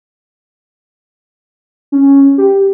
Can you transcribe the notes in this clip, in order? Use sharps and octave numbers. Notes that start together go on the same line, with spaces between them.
C#4
G4